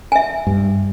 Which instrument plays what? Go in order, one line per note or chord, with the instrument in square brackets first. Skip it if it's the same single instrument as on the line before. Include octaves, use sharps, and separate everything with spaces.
[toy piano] E5 G#5
[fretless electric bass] G2